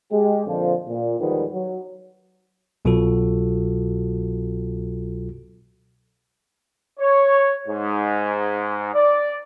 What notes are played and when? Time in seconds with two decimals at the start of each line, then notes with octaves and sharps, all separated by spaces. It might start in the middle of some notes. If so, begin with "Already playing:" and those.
0.11 G#3 G4
0.47 F2 A#2 D3 F3
0.88 A#2
1.20 E2 D#3 F3 G3 G#3 B3
1.53 F#3
2.85 C2 B2 F#3 F4 F#4 A4
7.00 C#5
7.68 G#2
8.94 D5